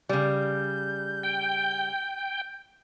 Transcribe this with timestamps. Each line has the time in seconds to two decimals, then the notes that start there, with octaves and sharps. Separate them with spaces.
0.09 C#3 G3 G6
1.23 G5